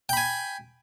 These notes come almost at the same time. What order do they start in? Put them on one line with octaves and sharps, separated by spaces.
G5 B5 G#5